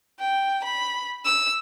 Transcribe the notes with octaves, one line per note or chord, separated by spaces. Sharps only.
G5
B5
E6